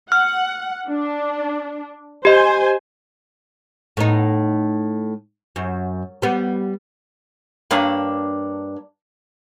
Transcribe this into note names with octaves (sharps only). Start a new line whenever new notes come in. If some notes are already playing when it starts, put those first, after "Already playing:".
F#5 F6
D4
G4 C5 D#5 G#5
A2 B3 D#4
F#2
G3 B3
G2 A#3 D4 C#5